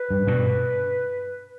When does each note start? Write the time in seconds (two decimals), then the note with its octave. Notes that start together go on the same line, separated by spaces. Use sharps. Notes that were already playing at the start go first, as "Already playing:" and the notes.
Already playing: B4
0.10 G2
0.27 G2 B2